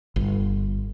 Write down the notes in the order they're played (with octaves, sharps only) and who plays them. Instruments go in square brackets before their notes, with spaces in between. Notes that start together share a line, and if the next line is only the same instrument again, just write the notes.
[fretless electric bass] G1